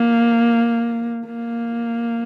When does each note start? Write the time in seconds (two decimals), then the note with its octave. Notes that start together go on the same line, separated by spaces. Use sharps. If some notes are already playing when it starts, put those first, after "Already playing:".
Already playing: A#3
1.25 A#3